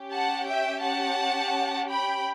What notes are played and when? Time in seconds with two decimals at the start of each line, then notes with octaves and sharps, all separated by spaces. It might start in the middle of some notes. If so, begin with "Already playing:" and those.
Already playing: C#4 G4
0.13 F#5 A5
0.49 E5 G5
0.84 F#5 A5
1.90 G5 B5